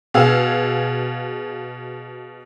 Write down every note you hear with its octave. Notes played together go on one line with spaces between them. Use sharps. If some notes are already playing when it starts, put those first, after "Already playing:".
B2 G#4 F5 E6